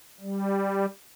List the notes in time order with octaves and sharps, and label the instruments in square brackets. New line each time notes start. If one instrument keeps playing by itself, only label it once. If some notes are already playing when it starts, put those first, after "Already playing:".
[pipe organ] G3